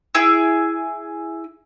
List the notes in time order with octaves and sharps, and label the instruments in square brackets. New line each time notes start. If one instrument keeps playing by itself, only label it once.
[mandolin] E4 G#4 E6